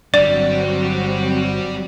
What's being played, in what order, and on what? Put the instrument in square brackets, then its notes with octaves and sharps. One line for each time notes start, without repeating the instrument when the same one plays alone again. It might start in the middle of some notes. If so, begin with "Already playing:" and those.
[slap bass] G1 D4 [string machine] F#3 C4 F#4 [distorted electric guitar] G3 [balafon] D5